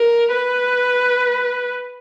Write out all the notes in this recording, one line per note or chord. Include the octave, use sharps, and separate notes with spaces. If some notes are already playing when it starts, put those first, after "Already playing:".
Already playing: A#4
B4